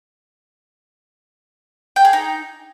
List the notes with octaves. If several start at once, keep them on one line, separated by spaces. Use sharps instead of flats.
G5
G#4
D#4